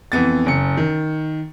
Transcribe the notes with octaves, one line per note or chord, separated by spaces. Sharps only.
F2 E3 B3 A6
F#1 C#7
D#3